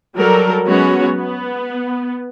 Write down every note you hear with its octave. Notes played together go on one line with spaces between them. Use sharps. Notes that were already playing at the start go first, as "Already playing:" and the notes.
F#3 G3 A4 A#4
F#3 G#3 B3 C#4 F#4 C#5
B3